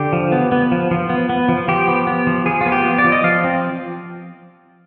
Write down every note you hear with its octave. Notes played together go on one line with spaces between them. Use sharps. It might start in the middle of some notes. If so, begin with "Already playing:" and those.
Already playing: D3 G4
F3
B3
B3
F3
F3
B3
B3
F3
F3 G4
B3
B3
F3
F3 G#4
F4
B3
G4
B3
D5
F3
D#5
F3 F5
C4